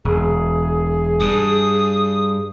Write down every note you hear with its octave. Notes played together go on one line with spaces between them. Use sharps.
E1 G#4
G2 D#6